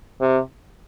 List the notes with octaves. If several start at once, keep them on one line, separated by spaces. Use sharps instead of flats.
C3